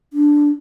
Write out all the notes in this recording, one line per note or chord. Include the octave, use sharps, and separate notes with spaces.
D4